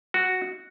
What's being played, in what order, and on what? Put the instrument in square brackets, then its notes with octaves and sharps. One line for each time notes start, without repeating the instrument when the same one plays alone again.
[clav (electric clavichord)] F#4